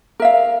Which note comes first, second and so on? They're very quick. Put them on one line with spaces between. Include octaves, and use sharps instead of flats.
A#4 E5 F5